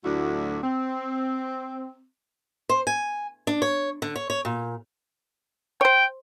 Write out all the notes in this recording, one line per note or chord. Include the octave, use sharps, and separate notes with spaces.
D2 A2 F#3 D4 E4 F#4
C4
C5
G#5
D4
C#5
D3
C#5
C#5
A#2
C5 C#5 G5